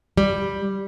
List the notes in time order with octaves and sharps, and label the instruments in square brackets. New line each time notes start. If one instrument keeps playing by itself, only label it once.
[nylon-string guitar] G3